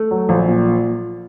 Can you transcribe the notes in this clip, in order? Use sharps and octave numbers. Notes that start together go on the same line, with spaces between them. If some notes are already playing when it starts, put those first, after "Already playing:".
Already playing: A3
F#3
A#1
A#2